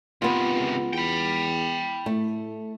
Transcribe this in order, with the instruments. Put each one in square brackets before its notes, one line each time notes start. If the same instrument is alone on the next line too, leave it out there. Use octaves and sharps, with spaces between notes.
[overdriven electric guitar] C3 D#3 [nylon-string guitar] B3 F4
[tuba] C#2
[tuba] E2 [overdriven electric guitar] G5 B5
[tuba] A2 [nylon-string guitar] A3